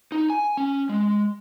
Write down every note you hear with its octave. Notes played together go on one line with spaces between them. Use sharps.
D#4
G#5
C#4
G#3